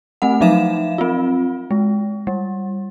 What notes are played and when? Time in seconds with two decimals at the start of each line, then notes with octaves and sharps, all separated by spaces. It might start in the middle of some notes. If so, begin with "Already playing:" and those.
0.22 A3 C4 F#5
0.41 F3 F#3 D#4 E5 F5 E7
0.98 C4 F4
1.71 G#3
2.27 G3